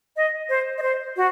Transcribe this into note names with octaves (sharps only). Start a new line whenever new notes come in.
D#5
C5
D#5
C5
F#4